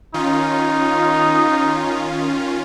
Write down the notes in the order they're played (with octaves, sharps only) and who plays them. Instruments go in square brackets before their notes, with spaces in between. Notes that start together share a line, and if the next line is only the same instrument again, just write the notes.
[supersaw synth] D#3 C#4 F4 [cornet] D#4